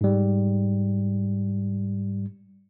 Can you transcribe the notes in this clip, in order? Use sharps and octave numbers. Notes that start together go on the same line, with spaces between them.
G#2 G3